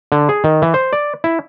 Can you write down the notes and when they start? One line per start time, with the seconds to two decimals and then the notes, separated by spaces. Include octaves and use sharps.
0.12 D3
0.29 G#4
0.44 D#3
0.62 E3
0.74 C5
0.93 D5
1.24 E4